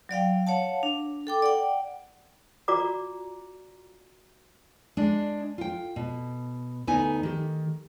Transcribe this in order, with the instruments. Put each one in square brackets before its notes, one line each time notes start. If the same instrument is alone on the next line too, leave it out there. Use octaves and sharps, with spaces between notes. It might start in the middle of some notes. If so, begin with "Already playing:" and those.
[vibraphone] F#3 D5 F5 G5
C#5 F5 F#5 A5
D4
A4 G5 D6
D5 F#5 G5
[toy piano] F4 F#4 D5 A#5 D6
[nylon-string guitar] G#3 D4
F4 G5
B2
D2 B3 D#4 G#5
D#3 G4